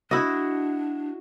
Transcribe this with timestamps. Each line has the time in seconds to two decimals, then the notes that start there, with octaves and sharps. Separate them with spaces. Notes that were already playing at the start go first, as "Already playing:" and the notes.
0.11 D4 E4 F#4 D#5